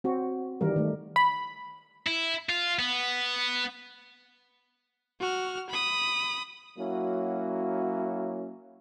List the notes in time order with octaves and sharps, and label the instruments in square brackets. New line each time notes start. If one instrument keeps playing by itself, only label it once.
[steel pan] C4 F#4
D#3 E3 G3 A#4
D#3 A3
[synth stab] B5
[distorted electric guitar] E4
F4
B3
[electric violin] F#4 F6
B5 D#6
[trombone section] F#3 A#3 C#4 E4 F#4